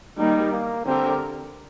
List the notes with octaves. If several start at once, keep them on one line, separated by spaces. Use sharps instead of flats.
D#3 G3 A#3 D#4
A#3
D3 G3 C4 D4 G4 A#4